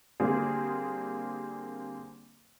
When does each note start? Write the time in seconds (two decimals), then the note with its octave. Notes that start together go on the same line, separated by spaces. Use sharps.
0.20 D3 G3 A#3 C4 G#4